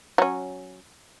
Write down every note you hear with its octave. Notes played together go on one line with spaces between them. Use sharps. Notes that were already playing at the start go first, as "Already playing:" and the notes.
F#3 C#4